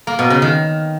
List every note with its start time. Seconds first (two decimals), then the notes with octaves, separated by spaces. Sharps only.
0.07 A#3
0.19 B2
0.30 C#3
0.42 D#3